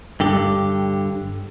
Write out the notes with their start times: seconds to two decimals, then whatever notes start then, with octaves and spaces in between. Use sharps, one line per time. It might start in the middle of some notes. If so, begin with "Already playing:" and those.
0.20 G2 D3 G4